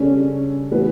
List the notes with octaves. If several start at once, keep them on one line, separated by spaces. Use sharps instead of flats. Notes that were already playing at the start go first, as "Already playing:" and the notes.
Already playing: C#3 G3 C#4 D4 A4 C#5
A2 E3 B3 E4 B4